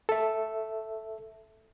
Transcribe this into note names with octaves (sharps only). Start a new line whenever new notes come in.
A4 E5